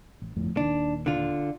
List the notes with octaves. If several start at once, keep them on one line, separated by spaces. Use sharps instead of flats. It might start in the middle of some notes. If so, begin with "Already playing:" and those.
A1
G1 F2 A2
D#1 A#2 D#3 D4
D3 F4